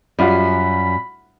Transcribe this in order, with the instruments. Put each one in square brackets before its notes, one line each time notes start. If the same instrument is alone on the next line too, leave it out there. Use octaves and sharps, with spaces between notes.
[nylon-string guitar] F#2 [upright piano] G3 F4 F#4 [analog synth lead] B5